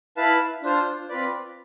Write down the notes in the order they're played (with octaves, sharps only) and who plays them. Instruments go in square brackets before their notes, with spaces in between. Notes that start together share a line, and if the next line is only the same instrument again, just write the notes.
[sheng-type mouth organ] E4 B4 F5 A5
D4 F4 C5
C4 F4 B4 D5